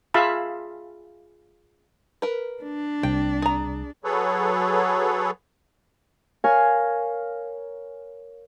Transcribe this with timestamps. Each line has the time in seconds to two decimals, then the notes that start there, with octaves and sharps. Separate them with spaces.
0.14 F4 G#4 E5 F5 A5 B5
2.22 A#4 B4
2.63 D4
3.03 C2 C3 G5
3.42 G#4 A#5
4.04 F#3 G#4 A4 B4 C#5
6.44 A#4 C#5 F5 G#5